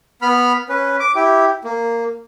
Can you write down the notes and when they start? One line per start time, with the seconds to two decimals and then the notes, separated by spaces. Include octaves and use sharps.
0.22 B3 B5 F6
0.69 C#4 B4
1.00 D6
1.15 E4 G4
1.64 A#3